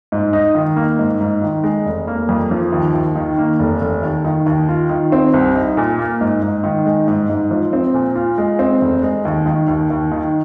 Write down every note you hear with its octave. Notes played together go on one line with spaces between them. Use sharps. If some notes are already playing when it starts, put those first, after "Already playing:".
G#2
D#4
D#3
A#3
G#2
G#2
D#3
G#3
F1
A#3
F2
F3
D#2
D#2
D#3
A#3
F1
F1
D#2
D#3
D#2
F4
D#3
C4
C2
D#4
A#2
A#3
G#2
G#2
D#3
G#3
G#2
G#2
F3
C4
A#2
F4
G#3
C4
F1
G#3
D#2
D#3
D#2
D#2
D#3